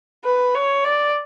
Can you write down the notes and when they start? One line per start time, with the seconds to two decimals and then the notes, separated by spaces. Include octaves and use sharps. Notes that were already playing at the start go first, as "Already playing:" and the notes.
0.24 B4
0.54 C#5
0.84 D5